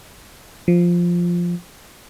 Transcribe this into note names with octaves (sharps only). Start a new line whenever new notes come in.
F3